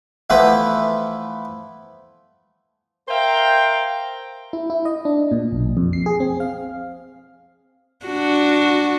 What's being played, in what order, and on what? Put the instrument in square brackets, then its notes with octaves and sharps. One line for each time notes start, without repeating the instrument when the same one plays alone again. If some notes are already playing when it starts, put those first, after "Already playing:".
[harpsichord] E3 F3 A3 B3 B4
[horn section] A#4 C5 E5 F5 G5 A#5
[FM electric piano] E4
E4
D#5
D4
A#2
B1
F2
C7
G#4
C4
F5
[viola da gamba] D4 F#4